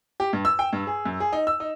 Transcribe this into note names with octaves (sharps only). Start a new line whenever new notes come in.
G4
G2
E6
G5
G2
G#4
F#2
G#4
D#4
E6
D#4